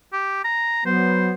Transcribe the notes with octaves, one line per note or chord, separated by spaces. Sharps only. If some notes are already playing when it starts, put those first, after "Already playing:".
G4
A#5
F#3 B3 C5